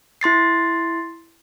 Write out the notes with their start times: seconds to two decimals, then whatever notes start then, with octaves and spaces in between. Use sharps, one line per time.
0.21 E4 C6 A6 C7